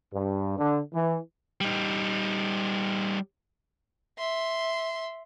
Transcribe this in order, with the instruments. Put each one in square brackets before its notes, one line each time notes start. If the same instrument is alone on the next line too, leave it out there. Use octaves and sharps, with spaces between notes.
[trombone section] G2
D3
E3
[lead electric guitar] G3 D#4
[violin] E5 C6